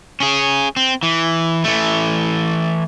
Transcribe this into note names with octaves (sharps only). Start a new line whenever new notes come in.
C#4 G#4
C4
E3
E3 A3